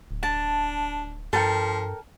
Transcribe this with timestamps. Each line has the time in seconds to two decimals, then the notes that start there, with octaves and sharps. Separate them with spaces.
0.11 D1
0.23 D4 A5
1.33 G2 F3 A4 A#4 G5